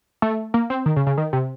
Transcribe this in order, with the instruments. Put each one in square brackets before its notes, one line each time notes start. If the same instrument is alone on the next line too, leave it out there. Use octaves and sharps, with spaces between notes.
[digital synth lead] A3
A#3
C4
D#3
C#3
C#3
D#3
C3